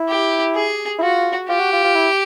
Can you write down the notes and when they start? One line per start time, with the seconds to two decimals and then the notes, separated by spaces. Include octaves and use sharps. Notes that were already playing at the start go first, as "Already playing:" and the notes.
Already playing: E4
0.08 G4
0.55 G#4
0.98 E4
1.02 F4 F#4
1.49 F4 G4
1.60 F#4
1.72 F4
1.84 F4
1.95 E4